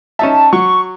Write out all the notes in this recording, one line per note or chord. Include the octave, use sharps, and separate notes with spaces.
C#4 D#4 E5 A5
F#3 C#6